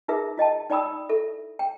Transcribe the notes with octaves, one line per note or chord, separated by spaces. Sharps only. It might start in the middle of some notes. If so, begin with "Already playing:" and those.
D#4 F4 G#4 A#4 B4 E5
F4 D#5 G5 A5
D#4 D5 G5 B5 D#6 E6
E4 A4 E5
G5